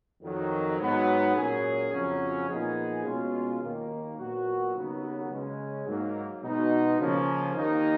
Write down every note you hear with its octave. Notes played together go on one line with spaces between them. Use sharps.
F2 D#3 F#3
G#2 F#3 B3
A#2 F#3 C#4 G#4
F2 C#3 F#3 C#4
A#2 F3 B3 D#4 G#4
B2 G#3 C#4 F4
D#2 D#3 A#3
A#2 F#3 B3 F#4
D#2 C#3 F#3 B3
C#3 G#3 C#4
G#2 F#3 A#3
B2 G#3 D#4
C#3 F3 A#3 C#4
D#2 D#3 A#3 D#4